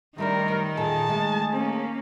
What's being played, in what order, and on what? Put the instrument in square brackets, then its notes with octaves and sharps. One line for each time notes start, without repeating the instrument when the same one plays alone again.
[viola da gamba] D#3 D#4 [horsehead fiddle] G3 A#4 [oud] A3 C4 D4
[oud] F#2 B4
[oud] E2 A#2 A4 [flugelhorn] G#4 [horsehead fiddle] A5
[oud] G#3 A3
[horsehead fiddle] A#3 C#4